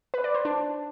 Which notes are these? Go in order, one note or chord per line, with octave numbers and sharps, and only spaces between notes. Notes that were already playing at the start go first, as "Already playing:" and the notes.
B4
D5
C5
D4